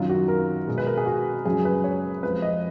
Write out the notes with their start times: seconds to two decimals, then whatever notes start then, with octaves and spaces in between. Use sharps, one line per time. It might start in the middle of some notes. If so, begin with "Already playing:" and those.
Already playing: F#2 D#3 F#3 F4
0.10 F#4
0.28 A#4
0.67 B2 G#3
0.78 B4
0.87 A#4
0.97 G#4
1.06 F#4
1.45 F#2 C#3 F#3 G#4
1.65 B4
1.84 C#5
2.23 F2 F3 G#3 B4
2.42 D#5